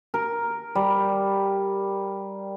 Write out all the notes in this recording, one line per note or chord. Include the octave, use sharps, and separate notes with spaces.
A#4
G3